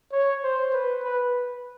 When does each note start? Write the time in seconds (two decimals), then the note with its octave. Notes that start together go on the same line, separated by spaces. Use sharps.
0.12 C#5
0.43 C5
0.73 B4
1.03 B4